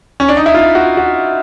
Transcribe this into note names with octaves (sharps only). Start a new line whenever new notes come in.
C#4
D4
D#4
E4
F4
F#4
F#4